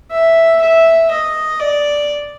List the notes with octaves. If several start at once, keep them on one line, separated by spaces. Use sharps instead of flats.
E5
E5
D#5
D5